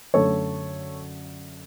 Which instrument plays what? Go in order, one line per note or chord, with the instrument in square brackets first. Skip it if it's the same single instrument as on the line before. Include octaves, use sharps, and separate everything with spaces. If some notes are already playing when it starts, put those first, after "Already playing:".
[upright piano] F#2 D3 A3 A4 C#5